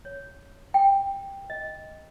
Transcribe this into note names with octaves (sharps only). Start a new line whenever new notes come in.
C#5
G5
D#5